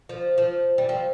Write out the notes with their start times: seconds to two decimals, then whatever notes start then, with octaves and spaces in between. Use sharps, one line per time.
0.09 F3
0.38 F3
0.78 G3
0.89 F3